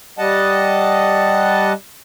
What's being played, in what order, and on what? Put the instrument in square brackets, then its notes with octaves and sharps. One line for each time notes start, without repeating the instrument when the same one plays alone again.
[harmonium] G3 D#5 F#5 A5